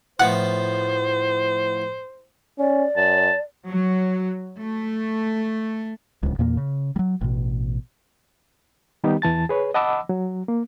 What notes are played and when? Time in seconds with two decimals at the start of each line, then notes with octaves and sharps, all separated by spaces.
0.19 A2 F3 B3 C5 F#5
2.59 C#4 D5
2.97 F#2 A5
3.67 F#3
4.60 A3
6.23 D1 C#2
6.39 E2 A#2 A#3
6.57 C#3
6.96 F#3 G3
7.21 A1 B2
9.04 D#3 G3 B3 D#4 G4
9.22 E2 E3 A5 A6
9.49 G#4 B4 C#5
9.74 D#5 F#5 A5 B5 D6 E6
10.09 F#3
10.48 A#3